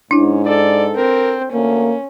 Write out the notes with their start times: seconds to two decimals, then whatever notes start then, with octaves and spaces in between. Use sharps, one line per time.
0.11 G#2 C#4 D4 E4
0.46 A4 D5
0.96 C4 A#4
1.53 D2 A#3 C#4